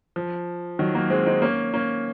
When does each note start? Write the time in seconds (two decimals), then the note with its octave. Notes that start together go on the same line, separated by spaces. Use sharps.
0.16 F3
0.79 D#3 F#3
0.95 F#3 A#3
1.10 G#3 C4
1.26 C4 D#4
1.42 A#3 C#4
1.74 A#3 C#4